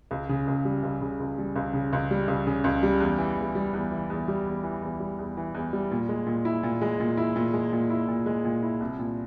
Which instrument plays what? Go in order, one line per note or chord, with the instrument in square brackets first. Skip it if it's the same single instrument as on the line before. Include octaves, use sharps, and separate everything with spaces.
[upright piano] C#2
C#3
C#2
G3
C#2
C#3
C#2
G3
C#2
C#3
C#2
G3
C#2
C#3
C#2
G3
E2
E3
E2
G3
E2
E3
E2
G3
E2
E3
E2
G3
E2
E3
E2
G3
A#2
G#3
A#2
E4
A#2
G#3
A#2
E4
A#2
G#3
A#2
E4
A#2
G#3
A#2
E4
C2
A#2